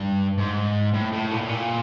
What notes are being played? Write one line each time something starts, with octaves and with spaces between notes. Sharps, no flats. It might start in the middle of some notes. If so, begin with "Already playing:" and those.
Already playing: G2
G#2
A2
A2
A#2
A2
A#2